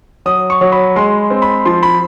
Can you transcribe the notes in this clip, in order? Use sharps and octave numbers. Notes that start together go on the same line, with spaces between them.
F#3 D#6
C#6
F#3
B5
G#3 C6
C4
B5
F3 C6
B5